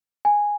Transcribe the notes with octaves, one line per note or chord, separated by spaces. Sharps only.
G#5